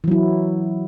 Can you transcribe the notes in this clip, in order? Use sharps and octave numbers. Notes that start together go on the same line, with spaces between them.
E3 F#3 E4